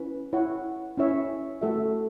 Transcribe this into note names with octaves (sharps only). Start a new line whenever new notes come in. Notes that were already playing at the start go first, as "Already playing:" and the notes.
Already playing: C#4 E4 B4
E4 C#5 F#5
C#4 E4 C#5 E5
A3 F#4 A4 E5